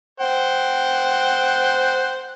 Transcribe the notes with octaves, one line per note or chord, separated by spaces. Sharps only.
C5 F#5 G5